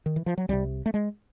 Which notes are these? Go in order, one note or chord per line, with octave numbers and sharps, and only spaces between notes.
D#3
E3
F3
F#3
C2 C3 G3
A3
G#3